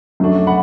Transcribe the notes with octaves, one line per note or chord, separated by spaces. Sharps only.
F#2 F#3 A3 D4
F#5 B5